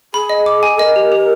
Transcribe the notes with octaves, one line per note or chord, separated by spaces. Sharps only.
G#4 B5
D#5
D6
G#5
A#4 D#5
G4
G4